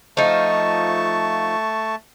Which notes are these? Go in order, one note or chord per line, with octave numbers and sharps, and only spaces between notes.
F3 A3 D#4 A5 C#6